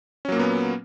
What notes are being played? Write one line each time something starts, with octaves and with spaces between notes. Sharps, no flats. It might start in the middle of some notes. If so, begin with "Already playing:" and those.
A#2 F#3 A#3 B3 C#4